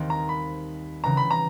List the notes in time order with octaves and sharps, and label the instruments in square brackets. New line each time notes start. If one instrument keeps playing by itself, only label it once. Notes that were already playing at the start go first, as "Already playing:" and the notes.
Already playing: [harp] D#2 D#3 G3 C4 D#4
[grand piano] A#5
B5
[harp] C#3 E3 G3 [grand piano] A#5
[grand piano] B5
A#5